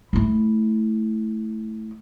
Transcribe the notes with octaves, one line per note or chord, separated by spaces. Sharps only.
A3 E4